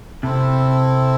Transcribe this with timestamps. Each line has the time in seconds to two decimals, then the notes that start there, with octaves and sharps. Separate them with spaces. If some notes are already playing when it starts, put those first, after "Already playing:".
0.23 C3 C4 E4 A4